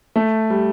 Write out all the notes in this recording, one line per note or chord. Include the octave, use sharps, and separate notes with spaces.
A3
G3